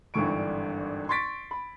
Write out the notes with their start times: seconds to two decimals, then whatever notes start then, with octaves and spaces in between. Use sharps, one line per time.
0.14 G#1 G2 D3 E3 C#6 D7
1.09 C6 C#6 A6 B6 D7
1.51 B5